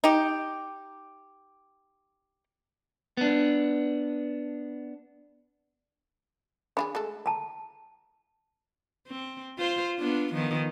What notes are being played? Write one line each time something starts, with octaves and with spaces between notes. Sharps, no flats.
D#4 G4
B3 D4
D4 F4 G#4 B5
G#3 A3 A4
A5 A#5
C4
F4 C5
B3 D4 F4
D#3 F3 B3